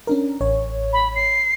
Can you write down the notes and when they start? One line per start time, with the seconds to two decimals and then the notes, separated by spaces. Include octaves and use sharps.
0.07 C#4 D4 A#4
0.41 A1 C#5
0.93 B5
1.15 C7